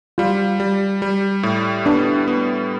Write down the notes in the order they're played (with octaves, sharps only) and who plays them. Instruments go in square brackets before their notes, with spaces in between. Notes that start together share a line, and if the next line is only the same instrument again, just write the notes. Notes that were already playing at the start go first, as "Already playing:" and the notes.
[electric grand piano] G3 [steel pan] F4
[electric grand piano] G3
G3
A2
[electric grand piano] B3 [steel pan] D4
[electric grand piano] B3